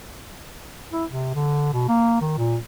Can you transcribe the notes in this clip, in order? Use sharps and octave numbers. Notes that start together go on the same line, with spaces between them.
E4
C3
D3
B2
A#3
D#3
A#2